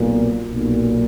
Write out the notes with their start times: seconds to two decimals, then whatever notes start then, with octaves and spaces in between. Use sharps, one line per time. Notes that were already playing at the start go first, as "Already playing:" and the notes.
Already playing: B1 A#2
0.48 B1 A#2